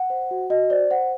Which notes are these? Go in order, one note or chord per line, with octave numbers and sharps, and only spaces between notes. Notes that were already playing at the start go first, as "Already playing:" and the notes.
Already playing: F#5
C5
F#4
F#4 D#5
C5 D5
C5 F#5